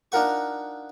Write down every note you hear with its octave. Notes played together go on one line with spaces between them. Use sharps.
D4 D#4 F4 A#4 F#5 C#6